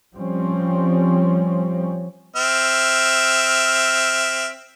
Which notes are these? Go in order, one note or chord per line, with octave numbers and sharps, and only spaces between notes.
F3 G3 C4 C#4
C4 E5 F6